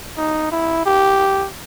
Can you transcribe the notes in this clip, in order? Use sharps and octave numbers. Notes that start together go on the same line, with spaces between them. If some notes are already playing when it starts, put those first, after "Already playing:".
D#4
E4
G4